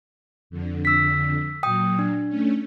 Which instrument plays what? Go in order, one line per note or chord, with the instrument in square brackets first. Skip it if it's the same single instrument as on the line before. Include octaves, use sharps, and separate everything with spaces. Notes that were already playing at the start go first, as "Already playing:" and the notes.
[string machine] F2 D3
[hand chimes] E6 B6
[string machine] A#2 F#3 [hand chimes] G5 D#6
[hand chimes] D4
[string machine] A3 C#4